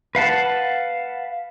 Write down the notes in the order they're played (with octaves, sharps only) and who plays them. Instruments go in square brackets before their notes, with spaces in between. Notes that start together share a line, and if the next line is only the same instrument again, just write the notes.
[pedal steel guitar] B4 F5 F#5 A5